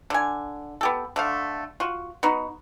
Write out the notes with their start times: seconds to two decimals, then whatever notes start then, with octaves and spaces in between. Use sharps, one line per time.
0.10 D3 G#5
0.81 B3 G4 A4
1.16 D3 A3 F5
1.80 F4 F#4
2.23 B3 D#4 F#4